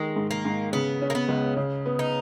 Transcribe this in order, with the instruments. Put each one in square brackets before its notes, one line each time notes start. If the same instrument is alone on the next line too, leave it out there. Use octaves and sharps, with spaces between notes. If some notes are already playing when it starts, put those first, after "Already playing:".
Already playing: [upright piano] D#3 [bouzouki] G#3
[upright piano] G#2
[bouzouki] A#3
[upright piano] G#2
[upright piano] C#3 [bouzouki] B3
[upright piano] C#4
[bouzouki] A#3
B3
[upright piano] C#2
C#3
B3
[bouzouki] D#4